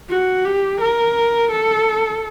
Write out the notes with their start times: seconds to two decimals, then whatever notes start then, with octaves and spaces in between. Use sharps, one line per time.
0.09 F#4
0.45 G4
0.80 A#4
1.51 A4